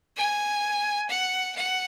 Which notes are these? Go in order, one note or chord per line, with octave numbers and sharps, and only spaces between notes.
G#5
F#5
F#5